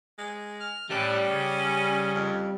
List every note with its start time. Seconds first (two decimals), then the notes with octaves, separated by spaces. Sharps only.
0.19 G#3
0.60 F6
0.90 A2 G3 C#4 D5 A5 F#6
1.28 C#3
2.14 F2